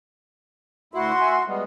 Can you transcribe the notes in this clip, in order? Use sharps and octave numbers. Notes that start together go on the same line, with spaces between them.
D2 E4 F#4 C6
E5 G#5
G3 G#3 B3